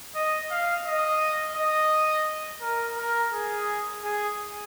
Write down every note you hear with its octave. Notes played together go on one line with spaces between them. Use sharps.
D#5
F5
D#5
D#5
A#4
A#4
G#4
G#4